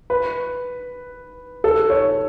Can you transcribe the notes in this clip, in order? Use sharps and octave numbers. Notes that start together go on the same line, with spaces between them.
B4
A4
C#5